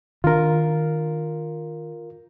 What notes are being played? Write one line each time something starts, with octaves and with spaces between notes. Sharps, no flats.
D#3 D4 F4 A#4